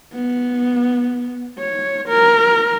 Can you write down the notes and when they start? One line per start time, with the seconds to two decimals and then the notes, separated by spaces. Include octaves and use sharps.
0.14 B3
1.58 C#5
2.09 A#4